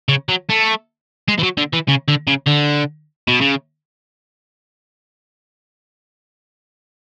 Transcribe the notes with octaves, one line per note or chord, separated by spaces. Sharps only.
C#3
F#3
A3
G#3
E3
F#3
D3
E3
C#3
D3
C#3
D3
B2
C#3